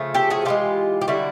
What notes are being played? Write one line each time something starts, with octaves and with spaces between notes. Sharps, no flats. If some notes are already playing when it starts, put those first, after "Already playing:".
Already playing: C#3 F3 A3
G4 A4
F#4 G#4
C#3 E3 G#3 F4 G4
G4
D3 G3 E4 F#4